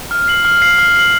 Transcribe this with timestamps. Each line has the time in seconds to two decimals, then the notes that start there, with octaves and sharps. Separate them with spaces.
0.11 F6
0.28 C7 F#7
0.45 F6
0.62 C7 F#7
0.78 F6
0.96 C7 F#7